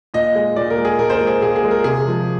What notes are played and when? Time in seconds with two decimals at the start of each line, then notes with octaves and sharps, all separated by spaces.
0.14 A#2 D#5
0.35 G#3
0.56 A#2 D5
0.70 A#4
0.78 G#3
0.85 G#4
0.99 A#2 A#4
1.10 C5
1.14 A#4
1.20 G#3
1.27 G#4
1.42 A#2 G#4
1.56 G#4
1.63 G#3
1.71 A#4
1.84 C3 G#4
2.06 F3 G#3